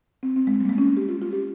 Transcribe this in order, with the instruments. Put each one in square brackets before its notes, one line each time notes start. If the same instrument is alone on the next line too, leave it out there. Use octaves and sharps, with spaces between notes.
[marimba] C4
C4
G#3
G3
A#3
G#3
C#4
G4
F4
F4
G4